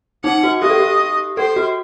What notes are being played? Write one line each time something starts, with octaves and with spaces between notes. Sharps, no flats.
D#4 F#5
F#4
G4 D#5
A4
G4
A4 C5
F#4